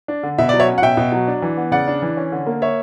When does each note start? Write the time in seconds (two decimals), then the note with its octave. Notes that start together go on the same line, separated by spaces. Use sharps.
0.08 D4
0.23 D3
0.38 B2 E5
0.49 F#3 D5
0.60 C#5 E5
0.68 C#4
0.78 F#5
0.82 B2 E5 G5
0.97 B2
1.12 F#3
1.28 D4
1.42 E3
1.57 B3
1.72 C#3 D5 F#5
1.88 D4
2.02 E3
2.17 C#4
2.32 D3
2.46 A#3
2.62 C#5 E5